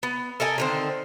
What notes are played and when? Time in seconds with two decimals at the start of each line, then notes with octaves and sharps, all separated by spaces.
0.03 B3
0.40 A4 A#4 D#5 G#5
0.58 D3 D#3 C4